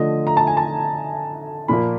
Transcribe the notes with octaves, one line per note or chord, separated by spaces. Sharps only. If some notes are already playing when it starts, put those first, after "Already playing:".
Already playing: D3 F3 A3 D#5
A#5
A5
G#5
A5
A#2 F3 A#3 B5